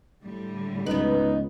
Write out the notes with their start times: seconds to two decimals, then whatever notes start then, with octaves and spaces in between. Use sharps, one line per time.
0.23 A2 D3 G3
0.86 C#2 B3 D#4 B4